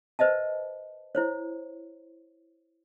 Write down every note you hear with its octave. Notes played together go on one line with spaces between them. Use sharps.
B4 C5 D#5 E5 A5
E4 C5 C#5